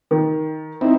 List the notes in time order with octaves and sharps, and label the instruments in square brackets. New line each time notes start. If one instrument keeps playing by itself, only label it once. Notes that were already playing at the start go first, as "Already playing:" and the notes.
[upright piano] D#3
[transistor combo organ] C4 D#4 E4